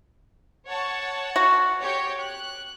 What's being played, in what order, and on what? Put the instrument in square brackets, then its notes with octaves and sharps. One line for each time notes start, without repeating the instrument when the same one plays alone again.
[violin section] C#5 F#5 A5
[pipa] F#4
[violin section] G4 C#5 G5
F#6